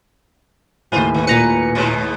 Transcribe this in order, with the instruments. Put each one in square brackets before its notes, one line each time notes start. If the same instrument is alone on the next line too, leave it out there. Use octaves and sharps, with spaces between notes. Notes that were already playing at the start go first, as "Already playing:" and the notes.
[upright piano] D#2 A2 [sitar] F4 B4 C5 [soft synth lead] G#5
[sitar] D#3
[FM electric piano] A#2 A#5 C#7 [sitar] B4
[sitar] G#2 B2 G#3